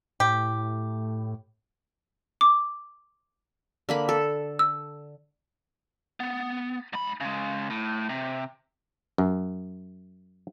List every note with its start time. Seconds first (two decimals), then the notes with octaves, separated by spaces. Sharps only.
0.20 A2 G4
2.41 D6
3.89 D3 A#3 B5
4.09 A4
4.59 E6
6.20 B3
6.93 G#2 B5
7.21 C#3 G#3
7.70 A2
8.09 C3
9.18 F#2